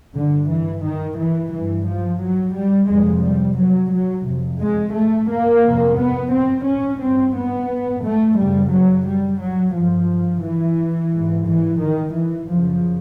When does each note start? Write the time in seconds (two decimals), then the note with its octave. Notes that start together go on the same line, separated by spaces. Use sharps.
0.15 G2 D3
0.49 E3
0.84 D#3
1.18 E3
1.53 G2 E3
1.87 F3
2.21 F#3
2.54 G3
2.89 F2 C3 G#3
3.23 G3
3.58 F#3
3.92 F#3
4.27 F2 C3
4.60 G#3
4.95 A3
5.29 A#3
5.64 F2 C3
5.98 B3
6.32 C4
6.66 C#4
7.00 G2 C4
7.35 B3
8.03 A3
8.37 F#2 C#3 G3
8.72 F#3
9.06 G3
9.41 F#3
9.75 G2 F3
10.43 E3
11.13 G#2
11.47 E3
11.80 D#3
12.14 E3
12.49 F#2 C#3 F3